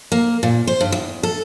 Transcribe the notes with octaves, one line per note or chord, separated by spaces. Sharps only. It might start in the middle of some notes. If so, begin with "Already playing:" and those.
A#3
A#2
C5
G2
E2
A4